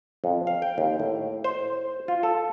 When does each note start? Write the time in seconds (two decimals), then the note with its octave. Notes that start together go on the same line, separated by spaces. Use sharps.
0.24 F2
0.47 F5
0.62 G5
0.78 D#2
1.00 A2
1.44 C5
2.08 F4
2.23 A4